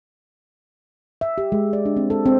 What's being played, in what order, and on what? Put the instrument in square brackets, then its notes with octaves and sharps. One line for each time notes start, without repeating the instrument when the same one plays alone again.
[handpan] E5
G4
G#3
D5
D4
C4
A4
C4